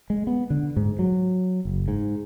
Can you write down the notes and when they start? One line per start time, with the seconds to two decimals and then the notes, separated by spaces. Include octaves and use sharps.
0.10 G#3
0.27 B3
0.50 D3
0.76 G#2
0.99 F#3
1.65 F#1
1.88 G#2